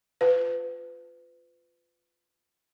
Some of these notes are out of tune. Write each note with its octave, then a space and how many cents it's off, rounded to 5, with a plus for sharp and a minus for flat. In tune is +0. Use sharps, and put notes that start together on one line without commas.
F4 +0 B4 +30